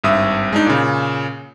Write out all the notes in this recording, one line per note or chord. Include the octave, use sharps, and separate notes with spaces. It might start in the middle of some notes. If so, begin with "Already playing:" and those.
G#1 G2 E5 D#6
G#3 D4 D#4
A#2 C#3